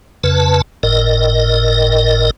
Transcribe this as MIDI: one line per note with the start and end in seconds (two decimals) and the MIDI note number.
0.24 0.62 41
0.24 0.62 49
0.24 0.62 71
0.24 0.62 81
0.83 2.31 31
0.83 2.31 45
0.83 2.31 70
0.83 2.31 75